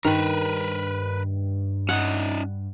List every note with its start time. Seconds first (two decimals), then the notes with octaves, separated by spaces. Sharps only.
0.05 G2 D#3 A#4 B4
1.89 C#4 D#4 F#5